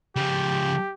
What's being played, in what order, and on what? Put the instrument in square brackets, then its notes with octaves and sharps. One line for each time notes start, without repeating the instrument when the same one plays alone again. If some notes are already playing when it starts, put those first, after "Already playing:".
[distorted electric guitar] C#3 F3 [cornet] G4